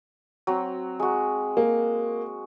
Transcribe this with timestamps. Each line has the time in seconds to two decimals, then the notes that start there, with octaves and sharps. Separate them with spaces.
0.47 F#3 C4
1.00 G#3 F#4
1.57 A#3